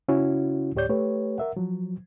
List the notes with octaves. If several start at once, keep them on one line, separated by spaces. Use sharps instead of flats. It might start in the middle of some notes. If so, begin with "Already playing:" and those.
C#3 C#4 E4 F#4
D2 A2 G4 C#5 D5 G6
A3 G4 B4 C#5
A#4 E5 F#5
F3 F#3